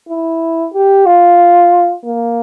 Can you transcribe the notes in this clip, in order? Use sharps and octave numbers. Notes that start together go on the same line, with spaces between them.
E4
G4
F4
A#3